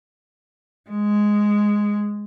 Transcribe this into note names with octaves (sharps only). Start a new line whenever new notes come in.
G#3